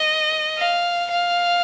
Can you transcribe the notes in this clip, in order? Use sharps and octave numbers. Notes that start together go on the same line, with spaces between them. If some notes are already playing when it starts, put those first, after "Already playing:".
Already playing: D#5
F5
F5